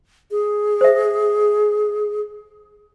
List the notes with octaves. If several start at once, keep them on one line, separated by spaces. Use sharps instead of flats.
G#4
C5 E5